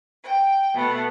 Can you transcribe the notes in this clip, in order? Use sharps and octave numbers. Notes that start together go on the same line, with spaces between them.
G5
B2 A3 B3